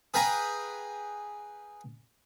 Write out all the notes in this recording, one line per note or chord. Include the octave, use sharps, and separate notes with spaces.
G#4 B4 F5 G5 G#5 A#5